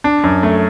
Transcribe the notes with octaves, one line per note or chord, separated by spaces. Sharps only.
D4
F#2
A3